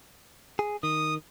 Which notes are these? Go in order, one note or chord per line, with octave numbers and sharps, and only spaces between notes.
G#4
D#3 D#6